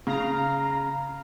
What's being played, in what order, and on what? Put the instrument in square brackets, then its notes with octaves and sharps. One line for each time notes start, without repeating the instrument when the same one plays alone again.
[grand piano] C#3 [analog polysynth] F5 A#5